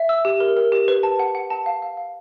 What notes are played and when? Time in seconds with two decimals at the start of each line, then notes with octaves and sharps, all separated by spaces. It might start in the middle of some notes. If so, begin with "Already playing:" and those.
Already playing: E5
0.09 E6
0.25 G4
0.40 A#4
0.57 A#4
0.72 G4
0.88 B4
1.03 A5
1.19 F#5
1.35 F#5
1.50 A5
1.66 F5
1.82 F5
1.97 F5